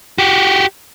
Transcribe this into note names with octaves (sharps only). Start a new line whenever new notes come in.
F#4 G4